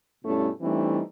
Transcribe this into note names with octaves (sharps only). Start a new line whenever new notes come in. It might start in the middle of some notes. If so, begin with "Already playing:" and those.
G2 B2 A3 C#4 E4 A4
E3 G3 A3 C4 D4 D#4